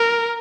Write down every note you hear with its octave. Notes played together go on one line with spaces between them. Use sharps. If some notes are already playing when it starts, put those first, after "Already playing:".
Already playing: A#4